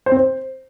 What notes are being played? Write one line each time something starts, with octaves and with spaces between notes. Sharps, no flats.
C5
C4
C5